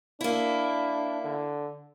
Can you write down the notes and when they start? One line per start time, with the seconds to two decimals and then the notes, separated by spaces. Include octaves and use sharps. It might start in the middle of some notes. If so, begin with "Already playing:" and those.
0.21 A#3 D4 E4
1.25 D3